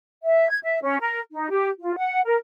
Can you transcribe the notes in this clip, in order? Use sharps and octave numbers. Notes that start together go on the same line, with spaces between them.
E5
G#6
E5
C#4
A#4
D#4
G4
F4
F#5
A#4